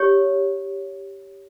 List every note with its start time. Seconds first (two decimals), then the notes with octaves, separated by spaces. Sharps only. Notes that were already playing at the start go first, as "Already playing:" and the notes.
Already playing: G4 C#5